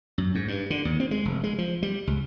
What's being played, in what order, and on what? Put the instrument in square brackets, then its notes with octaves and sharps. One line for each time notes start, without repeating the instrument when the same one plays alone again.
[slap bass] F#2
G#2
G2
D3
D#2
C4
G#3
F1
G#3
F3
G3
C#2